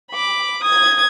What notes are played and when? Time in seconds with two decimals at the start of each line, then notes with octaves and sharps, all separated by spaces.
0.12 B5 D6
0.63 D#6 G#6